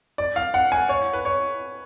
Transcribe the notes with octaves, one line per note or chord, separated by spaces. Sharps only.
D5
F5
F#5
G#5
C#5
B4
C#5